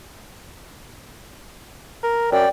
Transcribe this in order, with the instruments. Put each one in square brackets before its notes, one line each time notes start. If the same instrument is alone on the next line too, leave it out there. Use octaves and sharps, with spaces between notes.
[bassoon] A#4
[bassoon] F#2 [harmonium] D5 G5